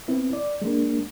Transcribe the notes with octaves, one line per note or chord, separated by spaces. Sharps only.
B3 C4 E4
D5
G#3 A#3 D4